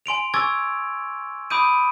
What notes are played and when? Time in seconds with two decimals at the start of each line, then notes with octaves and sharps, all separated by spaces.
0.06 G#5 C6 D7 F7
0.34 G#5 C#6 D6 E6 G#6 A6
1.50 B5 D6 D#6 G6 D7 D#7